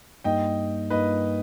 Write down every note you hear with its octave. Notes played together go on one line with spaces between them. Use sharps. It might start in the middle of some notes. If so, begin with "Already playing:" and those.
G2 G3 A#3 D#4 D#5 G5
G2 G3 A#3 D#4 B4 D#5